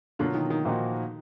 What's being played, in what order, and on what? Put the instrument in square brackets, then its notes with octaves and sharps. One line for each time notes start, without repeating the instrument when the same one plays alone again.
[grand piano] B2 F#3 A#3 F4 [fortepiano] D3
[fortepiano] D#3
D#3
[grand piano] A#2 F3 A#3 D#4 F#4 [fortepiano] D#3